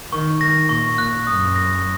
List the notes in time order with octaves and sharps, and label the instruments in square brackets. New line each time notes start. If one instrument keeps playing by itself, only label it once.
[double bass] D#3 [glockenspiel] C#6
[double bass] D#3 [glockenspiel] A#6
[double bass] A#2 [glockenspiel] C#6
[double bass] A#2 [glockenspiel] F#6
[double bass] F#2 [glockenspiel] D#6
[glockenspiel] A#6